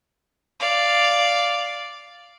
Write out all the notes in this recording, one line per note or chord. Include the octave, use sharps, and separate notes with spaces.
D5 F5